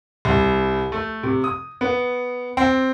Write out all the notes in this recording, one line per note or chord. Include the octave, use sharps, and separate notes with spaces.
C2
A3
C3
D#6
B3
C4